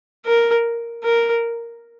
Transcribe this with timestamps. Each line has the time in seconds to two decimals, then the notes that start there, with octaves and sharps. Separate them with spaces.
0.26 A#4
1.04 A#4